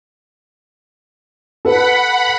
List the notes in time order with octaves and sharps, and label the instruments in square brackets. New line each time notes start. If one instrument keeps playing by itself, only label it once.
[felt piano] A4 B4 [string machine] F#5 B5